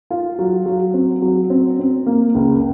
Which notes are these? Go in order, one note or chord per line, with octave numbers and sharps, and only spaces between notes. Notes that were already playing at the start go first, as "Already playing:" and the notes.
F4
F#3
F#3
C4
F#3
C4
C4
A#3
C#2